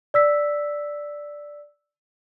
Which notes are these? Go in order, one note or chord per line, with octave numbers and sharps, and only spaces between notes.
D5 E6 B6